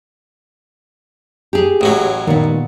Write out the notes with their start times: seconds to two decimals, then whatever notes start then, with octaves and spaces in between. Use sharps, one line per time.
1.53 G4 G#4
1.81 A1 A2 F#3
2.27 A#2 D#3 B3